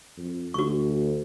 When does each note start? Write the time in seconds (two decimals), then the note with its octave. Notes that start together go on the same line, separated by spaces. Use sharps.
0.17 F2
0.54 D2 F#4 C#6